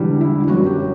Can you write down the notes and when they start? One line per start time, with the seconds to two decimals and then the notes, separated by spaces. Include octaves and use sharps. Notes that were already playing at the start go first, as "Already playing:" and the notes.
Already playing: E1 E2 D3 G3
0.21 E4
0.47 G1 F#2 F#3 F#4
0.66 G4